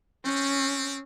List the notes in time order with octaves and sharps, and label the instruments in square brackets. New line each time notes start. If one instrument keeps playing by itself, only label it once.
[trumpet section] C4 [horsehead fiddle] C#4